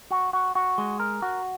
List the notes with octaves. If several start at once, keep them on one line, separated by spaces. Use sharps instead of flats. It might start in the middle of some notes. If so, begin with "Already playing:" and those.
F#4
F#4
F#4
G#3
A#4
F#4